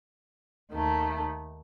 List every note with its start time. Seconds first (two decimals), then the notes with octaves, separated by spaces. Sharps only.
0.71 D#2 D#3 A3